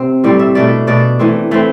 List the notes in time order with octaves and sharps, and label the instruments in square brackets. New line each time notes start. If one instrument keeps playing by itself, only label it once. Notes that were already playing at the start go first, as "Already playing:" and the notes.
Already playing: [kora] C3 C4
A2 G3 C4 D5
E5
B2 A3 D4 D5
B2 A3 D4 D5
E3 A3 C4
E3 A3 C4